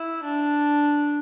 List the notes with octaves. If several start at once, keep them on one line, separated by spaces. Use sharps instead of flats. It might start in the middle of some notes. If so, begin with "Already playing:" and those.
Already playing: E4
D4